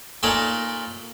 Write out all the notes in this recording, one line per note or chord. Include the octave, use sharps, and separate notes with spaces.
A#2 D#4 A4 C#5 D5 G#5